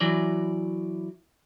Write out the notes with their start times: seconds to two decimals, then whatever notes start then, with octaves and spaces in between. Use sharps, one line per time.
0.01 E3 F#3 D5